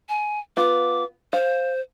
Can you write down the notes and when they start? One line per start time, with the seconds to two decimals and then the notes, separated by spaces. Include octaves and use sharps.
0.09 G#5
0.57 B3 F4 D6
1.33 C5 F5